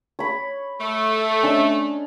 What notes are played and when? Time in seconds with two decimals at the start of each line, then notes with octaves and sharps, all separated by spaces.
0.19 C#5 B5
0.80 A3
1.43 C#4 D4 D#5